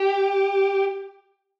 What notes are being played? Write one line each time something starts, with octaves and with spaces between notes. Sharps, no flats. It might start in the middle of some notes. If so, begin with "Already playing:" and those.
Already playing: G4